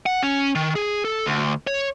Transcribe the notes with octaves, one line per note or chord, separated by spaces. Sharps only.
F#5
C#4
D#3
G#4
A4
D2
C#5